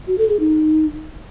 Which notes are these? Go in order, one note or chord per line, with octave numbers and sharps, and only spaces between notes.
F#4
A4
G#4
D#4